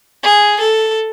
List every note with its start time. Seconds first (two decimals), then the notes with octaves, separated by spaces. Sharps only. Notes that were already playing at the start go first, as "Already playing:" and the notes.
0.23 G#4
0.61 A4